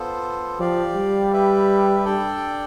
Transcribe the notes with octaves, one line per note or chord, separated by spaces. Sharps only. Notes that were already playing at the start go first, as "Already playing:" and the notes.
Already playing: B3 F4 A4 C5
F3 G4 D5 F5
G3
G4 B4 E5
D4 A4 D5 G5